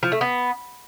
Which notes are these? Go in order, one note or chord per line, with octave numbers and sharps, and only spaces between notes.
F3
A3
B3